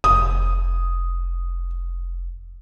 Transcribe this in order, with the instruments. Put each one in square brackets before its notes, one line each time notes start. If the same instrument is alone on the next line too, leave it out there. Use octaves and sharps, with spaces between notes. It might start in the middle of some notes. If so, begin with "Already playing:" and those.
[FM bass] F1 [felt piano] D#6